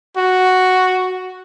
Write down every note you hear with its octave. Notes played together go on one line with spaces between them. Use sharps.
F#4